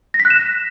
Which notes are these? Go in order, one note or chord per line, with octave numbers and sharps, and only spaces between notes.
A#6
B6
F#6
E7
A#6